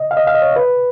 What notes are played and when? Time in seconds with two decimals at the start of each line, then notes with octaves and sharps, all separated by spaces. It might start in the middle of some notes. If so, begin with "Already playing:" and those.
Already playing: D#5
0.11 F5
0.17 D#5
0.27 F5
0.35 D#5
0.42 C#5
0.56 B4